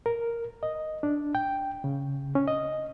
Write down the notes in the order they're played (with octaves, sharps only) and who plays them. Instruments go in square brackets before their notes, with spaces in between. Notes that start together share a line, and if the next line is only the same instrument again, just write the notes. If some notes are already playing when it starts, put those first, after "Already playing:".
[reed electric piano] A#4
D#5
D4
G5
C#3
C#4
D#5